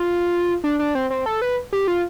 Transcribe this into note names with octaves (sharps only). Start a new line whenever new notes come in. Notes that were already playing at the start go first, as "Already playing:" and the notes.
Already playing: F4
D4
D4
C4
C4
A4
B4
G4
F4